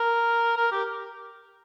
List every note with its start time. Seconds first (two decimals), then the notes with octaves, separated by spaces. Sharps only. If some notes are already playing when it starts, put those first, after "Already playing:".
Already playing: A#4
0.57 A#4
0.72 G4